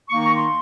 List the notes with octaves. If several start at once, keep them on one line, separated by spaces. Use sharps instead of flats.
D#3 A#3 D#4 C#6
A#5
C6